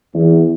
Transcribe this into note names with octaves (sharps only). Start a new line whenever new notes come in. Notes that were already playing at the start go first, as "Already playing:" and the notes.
E2